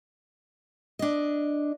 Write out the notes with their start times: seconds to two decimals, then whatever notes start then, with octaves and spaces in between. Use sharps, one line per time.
0.99 D4 D#5